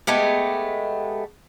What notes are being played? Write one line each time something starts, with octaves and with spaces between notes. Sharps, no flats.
G#3 A3 B3 G4